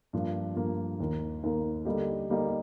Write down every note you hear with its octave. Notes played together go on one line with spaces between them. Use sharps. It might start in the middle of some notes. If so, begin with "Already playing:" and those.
G2 F3 A#3
G2 F3 A#3
D#2 D#3 A#3
D#2 D#3 A#3
D3 G3 A#3 D#4 G4
D3 G3 A#3 D#4 G4